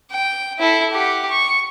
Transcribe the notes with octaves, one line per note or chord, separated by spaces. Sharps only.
G5
E4 A4
G4 F#5
C#6